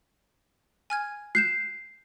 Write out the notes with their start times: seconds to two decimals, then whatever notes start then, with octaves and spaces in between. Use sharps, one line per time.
0.90 G#5 F6 G#6
1.35 F#6 G6 C7 E7